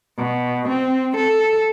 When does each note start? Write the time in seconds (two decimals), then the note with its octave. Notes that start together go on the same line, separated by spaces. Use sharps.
0.18 B2
0.68 C4
1.17 A4